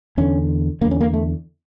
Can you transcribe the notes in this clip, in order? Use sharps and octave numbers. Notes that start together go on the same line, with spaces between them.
E2 D3 C#4
E2 D3 A#3
C#4
A#3
A3